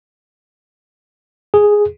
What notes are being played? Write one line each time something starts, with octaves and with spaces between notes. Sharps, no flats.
G#4